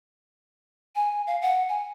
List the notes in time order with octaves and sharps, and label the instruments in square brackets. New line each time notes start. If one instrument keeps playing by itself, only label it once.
[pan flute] G#5
F5
F#5
G#5